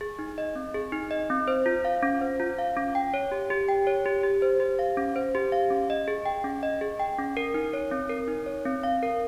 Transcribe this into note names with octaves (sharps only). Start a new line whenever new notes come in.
G#4
D#4
D#5
C4
G#4
D#4
D#5
C4
C5
F4
F5
C#4
C5
F4
F5
C#4
G5
C#5
G4
G4
G5
C#5
G4
G4
C5
G4
F5
C#4
C5
G4
F5
C#4
D#5
G#4
G5
C#4
D#5
G#4
G5
C#4
A#4
D#4
C#5
C4
A#4
D#4
C#5
C4
F5
A#4